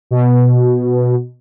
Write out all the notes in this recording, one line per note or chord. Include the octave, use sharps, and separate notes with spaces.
B2